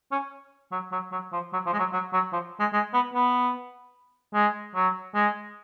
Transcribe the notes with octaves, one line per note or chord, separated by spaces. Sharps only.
C#4
F#3
F#3
F#3
F3
F#3
F3
G#3
F#3
F#3
F#3
F3
G#3
G#3
B3
B3
G#3
F#3
G#3